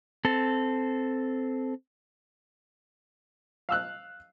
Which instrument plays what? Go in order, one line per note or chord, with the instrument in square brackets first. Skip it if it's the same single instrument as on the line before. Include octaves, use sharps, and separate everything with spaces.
[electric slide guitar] C4 A4
[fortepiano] F5 E6 F#6